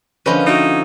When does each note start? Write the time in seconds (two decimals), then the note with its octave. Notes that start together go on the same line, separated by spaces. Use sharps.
0.26 D3 F3 C#4 B4 D#5
0.46 D#4 E4 F#4